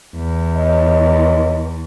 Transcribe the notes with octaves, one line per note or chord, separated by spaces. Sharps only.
E2
C#5 D#5